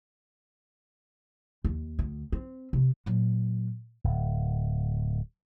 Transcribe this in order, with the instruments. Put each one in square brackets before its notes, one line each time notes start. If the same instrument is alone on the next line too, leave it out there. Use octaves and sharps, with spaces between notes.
[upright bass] D#2
D2
C4
C3
A#2 F#3
[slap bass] D1